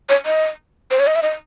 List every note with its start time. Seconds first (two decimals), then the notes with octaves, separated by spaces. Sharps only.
0.09 C#5
0.26 D#5
0.91 C5
0.99 C#5
1.07 D#5
1.15 E5
1.22 D#5